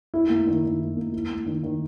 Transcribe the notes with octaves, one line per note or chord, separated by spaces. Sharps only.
E4
A#3
D#3
D#3
E4
A#3
E4
A#3
D#3
D#3